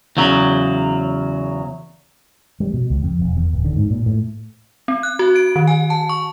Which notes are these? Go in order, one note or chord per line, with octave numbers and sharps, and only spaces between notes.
E2 C#3 F#3
G3
B2
C#2
F2
E1
E2
D1
D3
G#2
A#2
A2
C4
F#6
F#4
D7
D#3
G#5
A5
C#6